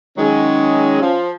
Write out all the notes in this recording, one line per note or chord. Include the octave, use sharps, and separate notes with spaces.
D#3 F#3 G#3 C#4
F3